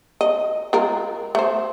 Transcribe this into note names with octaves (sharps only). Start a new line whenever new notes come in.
D#5
G#3 F4 A#4
A3 C5